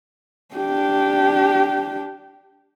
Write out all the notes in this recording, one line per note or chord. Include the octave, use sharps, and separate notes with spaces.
D4 G4